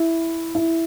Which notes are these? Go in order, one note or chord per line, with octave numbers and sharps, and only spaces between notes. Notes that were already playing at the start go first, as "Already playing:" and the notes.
Already playing: E4
E4